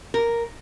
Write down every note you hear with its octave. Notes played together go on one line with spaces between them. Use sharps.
A#4